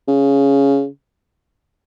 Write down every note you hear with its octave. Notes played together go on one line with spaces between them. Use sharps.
C#3